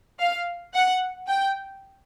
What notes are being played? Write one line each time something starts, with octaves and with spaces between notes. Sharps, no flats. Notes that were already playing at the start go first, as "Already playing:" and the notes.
F5
F#5
G5